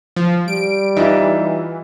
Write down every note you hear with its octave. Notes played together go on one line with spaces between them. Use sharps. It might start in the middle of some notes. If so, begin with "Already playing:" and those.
F3
G3 D7
E3 D#4 F4 E5